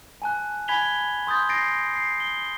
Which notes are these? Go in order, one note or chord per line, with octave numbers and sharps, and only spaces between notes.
G#5 A5 F#6
G#5 B5 G#6 B6 F7 G7
C6 D#6 G6 A6
A6 A#6 C7 D7
C7
G7